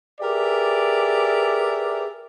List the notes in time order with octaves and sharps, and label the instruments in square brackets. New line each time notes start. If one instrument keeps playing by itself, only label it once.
[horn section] G4 G#4 A#4 B4 D5 E5